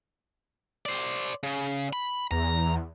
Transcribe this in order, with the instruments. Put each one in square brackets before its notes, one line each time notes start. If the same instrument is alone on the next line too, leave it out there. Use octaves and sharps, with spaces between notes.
[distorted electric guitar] C5 D5
C#3
B5
[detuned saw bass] E2 [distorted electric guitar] A#5